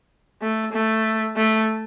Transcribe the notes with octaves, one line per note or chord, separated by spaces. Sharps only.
A3
A3
A3